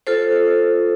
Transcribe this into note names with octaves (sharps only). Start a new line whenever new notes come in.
F4 A4 C5